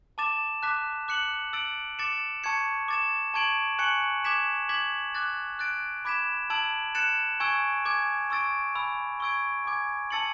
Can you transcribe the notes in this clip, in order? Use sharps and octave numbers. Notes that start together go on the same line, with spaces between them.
A5 D6 A6 E7
A5 D6 F#6 B6
D6 F#6 C#7 F#7
E6 A6 D7 F#7
D6 A6 C#7 E7
A5 C#6 G#6 C#7
D6 A6 E7
A5 C#6 G#6 D7 F#7
G#5 C#6 F#6 C#7 F#7
D6 G#6 B6 E7
D6 G#6 B6 F#7
D6 F#6 A6
F#6 A6 D7
B5 D6 G#6 B6 E7
A5 E6 G#6 D7 F#7
F#6 A6 C#7 E7
G#5 C#6 E6 G#6 D7
G#5 D6 G#6
C#6 E6 A6 D7
G#5 B5 E6
C#6 E6 G#6 D7
G#5 D6 G#6
A5 E6 A6 C#7 F#7